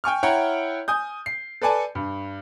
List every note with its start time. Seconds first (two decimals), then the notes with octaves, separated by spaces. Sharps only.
0.04 G5 G#5 C#6 F6
0.23 E4 C#5 F#5 G5 A#5
0.88 G#5 D#6 G6
1.26 C7
1.62 A4 B4 D5 G#5 A5
1.95 G2